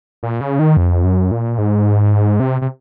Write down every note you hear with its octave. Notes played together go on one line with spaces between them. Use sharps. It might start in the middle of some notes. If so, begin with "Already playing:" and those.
A#2
C#3
D#3
F2
F#2
A#2
G#2
C3
C3